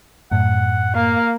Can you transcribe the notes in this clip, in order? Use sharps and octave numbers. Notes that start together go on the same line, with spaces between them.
F#2 A2 F#5
A#3 F5